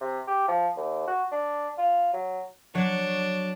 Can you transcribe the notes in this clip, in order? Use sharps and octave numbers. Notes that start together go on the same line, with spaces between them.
C3
G4
F3
D#2
F#4
D4
F4
F#3
F#3 D4 C#5